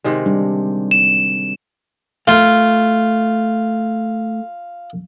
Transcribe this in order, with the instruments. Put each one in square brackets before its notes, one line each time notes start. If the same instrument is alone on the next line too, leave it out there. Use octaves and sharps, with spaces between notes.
[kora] C3 D#3 G#3
[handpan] G3 D4
[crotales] E7
[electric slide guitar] A3 [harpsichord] F4